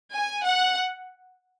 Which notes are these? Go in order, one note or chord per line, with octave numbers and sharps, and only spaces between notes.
G#5
F#5